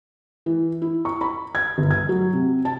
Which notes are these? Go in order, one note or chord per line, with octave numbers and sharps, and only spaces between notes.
E3
E4
C#6
B5
G#6
G1
G#6
F#3
C3
A5